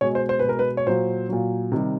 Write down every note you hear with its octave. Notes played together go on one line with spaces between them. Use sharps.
B2 G#3 C#5
C5
C5
B4
B2 G#3 A#4
B4
C#5
A#2 F#3 C5
A#2 F#3
C3 D#3 G3